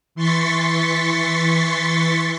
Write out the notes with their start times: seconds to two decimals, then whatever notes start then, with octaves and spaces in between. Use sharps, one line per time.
0.15 E3 C6 C#6 A6 B6 C#7